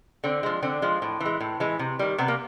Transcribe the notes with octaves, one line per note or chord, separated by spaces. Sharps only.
D3 C4
F3 G#3
D3 C4
F3 G#3
A2
E3
G#3
A2
E3 G#3
C3
D#3 G3
C3 B3
A#3